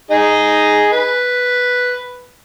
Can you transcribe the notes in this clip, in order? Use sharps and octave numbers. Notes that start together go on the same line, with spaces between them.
D#4 G#4 D#5
B4